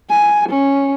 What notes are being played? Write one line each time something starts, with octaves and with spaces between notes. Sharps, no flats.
G#5
C#4